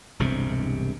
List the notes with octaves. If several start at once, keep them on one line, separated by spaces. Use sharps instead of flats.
E1 C2 G2 C3